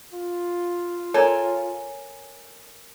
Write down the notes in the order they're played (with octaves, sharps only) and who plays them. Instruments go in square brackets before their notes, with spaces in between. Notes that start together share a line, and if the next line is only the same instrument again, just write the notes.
[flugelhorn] F4
[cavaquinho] A4 A#4 G#5 [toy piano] C#5